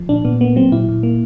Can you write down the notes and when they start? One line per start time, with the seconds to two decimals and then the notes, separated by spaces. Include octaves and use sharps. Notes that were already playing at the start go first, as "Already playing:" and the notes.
Already playing: F3
0.09 A#2 D4
0.25 A#2 B3
0.41 A#3 B3
0.56 F#3 C4
0.72 A#2 E4
0.89 A#2
1.03 A#3